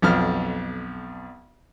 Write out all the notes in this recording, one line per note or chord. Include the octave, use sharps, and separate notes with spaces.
B1 F2 F6